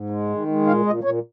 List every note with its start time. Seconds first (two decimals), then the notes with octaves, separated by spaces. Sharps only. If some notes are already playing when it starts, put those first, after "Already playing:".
Already playing: G#2
0.10 G#3
0.30 D#3
0.48 G#3
0.66 A#2 F5
0.85 A#2 D#5
1.04 A#2 C#5